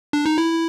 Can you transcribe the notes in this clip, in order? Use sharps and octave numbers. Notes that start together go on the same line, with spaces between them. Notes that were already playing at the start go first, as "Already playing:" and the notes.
D4
D#4
E4